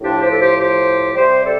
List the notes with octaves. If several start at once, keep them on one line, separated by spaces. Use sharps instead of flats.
A2 F3 D4 G4
G4 C5
A4
G4 C5
G4 C5
C3 G3 G4 C5
A4 D5